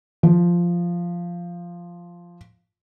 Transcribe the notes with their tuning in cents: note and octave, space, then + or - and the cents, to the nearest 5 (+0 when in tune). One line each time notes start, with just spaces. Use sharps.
F3 -5